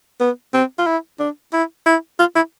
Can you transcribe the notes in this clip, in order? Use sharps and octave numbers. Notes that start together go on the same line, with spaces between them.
B3
C4
F4
E4
D4
E4
E4
F4
E4